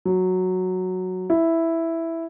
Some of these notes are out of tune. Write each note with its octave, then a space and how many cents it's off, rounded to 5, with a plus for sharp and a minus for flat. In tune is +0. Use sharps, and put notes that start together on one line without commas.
F#3 -5
E4 +0